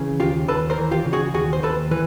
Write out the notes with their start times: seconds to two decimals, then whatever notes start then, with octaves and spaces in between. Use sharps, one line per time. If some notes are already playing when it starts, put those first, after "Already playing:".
Already playing: C#3 E3
0.20 D#2 F4 G4
0.48 D#2 A4 B4
0.70 A#4 C5
0.78 E3
0.91 F4 G4
1.05 C#3
1.13 F#4 G#4
1.34 D#2 F#4 G#4
1.53 C5
1.63 D#2 A4 B4
1.91 E3 B4